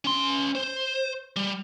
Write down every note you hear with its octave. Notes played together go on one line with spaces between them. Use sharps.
C#4 C6
C5
G3